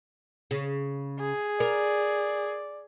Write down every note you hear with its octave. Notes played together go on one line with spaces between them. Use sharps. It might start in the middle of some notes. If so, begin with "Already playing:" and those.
C#3
G#4
A#4 D5